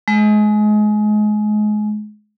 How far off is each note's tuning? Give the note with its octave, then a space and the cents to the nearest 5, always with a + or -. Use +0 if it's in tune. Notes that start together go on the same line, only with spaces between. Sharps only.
G#3 +30